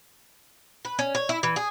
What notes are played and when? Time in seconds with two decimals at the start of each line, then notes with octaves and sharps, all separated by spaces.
0.85 B4
0.99 C#4
1.15 C#5
1.29 E4
1.43 E3
1.56 G#4